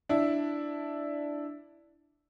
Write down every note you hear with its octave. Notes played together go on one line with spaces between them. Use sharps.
D4 E4